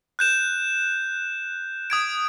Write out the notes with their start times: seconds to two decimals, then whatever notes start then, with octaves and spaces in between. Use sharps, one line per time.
0.19 F#6 G6 E7
1.90 D#6 G#6 D7